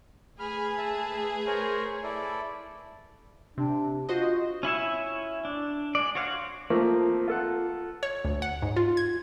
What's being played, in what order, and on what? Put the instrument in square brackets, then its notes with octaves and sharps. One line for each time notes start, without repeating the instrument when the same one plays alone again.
[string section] A3 G#4 B4 [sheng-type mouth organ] B5 F6
[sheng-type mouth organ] E5 A5
A#4 C5 C#5
E4 A4 D5
[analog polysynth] C3 [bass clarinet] D4
[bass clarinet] F4 [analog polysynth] F#4 C5 D#5
[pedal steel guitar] C#4 E4 C#5 E5
D4
G#3 D5
F#4 C5 C#5 F5 F#5
[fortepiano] F3 A3 A#3 C4
F4 A4 F#5
[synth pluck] C#5
D2
F#5
G#2
F4
G#6